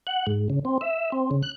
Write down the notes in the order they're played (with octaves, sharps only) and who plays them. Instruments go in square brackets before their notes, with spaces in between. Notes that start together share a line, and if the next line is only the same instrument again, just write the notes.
[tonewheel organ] F#5
G#2
C#3
C4
E5
C4
C#3
F#6